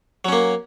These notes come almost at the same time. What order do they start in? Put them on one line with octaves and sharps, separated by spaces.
F#3 C#4 A#3